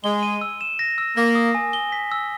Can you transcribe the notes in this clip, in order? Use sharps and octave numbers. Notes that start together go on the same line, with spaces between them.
G#3 G7
D#7
E6
E7
A#6
E6
A#3 A#6
D#6
G#5
G7
B6
E6